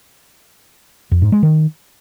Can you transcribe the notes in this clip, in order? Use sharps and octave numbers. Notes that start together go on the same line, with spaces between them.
F2
G#2
G#3
D#3